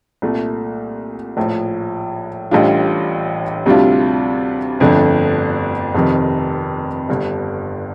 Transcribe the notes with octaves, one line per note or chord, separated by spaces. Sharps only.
C2 A#2 A3
A#1 A2 F3
A1 A2 G3 D4 F4
D2 C3 G3 D4 F4
G1 F2 D3 A3 D4
F1 F2 C3 D#3
G1 G2 D3